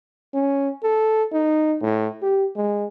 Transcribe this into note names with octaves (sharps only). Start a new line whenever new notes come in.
C#4
A4
D#4
A2
G4
G#3